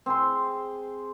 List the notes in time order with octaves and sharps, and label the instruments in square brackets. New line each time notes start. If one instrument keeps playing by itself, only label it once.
[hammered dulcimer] C4 G#4 C6